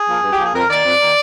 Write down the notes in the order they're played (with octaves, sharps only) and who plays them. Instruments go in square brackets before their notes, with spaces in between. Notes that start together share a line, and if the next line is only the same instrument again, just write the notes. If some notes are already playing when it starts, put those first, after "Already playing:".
Already playing: [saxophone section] G#4
F3 A#3
G2
G4
F3 A#3 G#4
F2 A#4
D#3 A#3 D5
F2
D#3 A#3